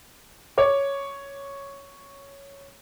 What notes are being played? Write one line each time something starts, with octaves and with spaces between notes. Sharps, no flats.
C#5 D6